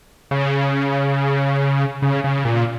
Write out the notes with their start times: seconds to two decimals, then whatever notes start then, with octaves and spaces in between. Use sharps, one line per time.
0.31 C#3
2.02 C#3
2.24 C#3
2.45 A#2